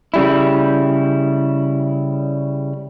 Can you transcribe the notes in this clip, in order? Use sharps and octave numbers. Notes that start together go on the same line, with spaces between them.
C#3 G3 E4